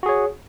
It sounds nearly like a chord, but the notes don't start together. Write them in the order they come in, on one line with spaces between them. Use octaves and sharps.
F#4 G#4 C#5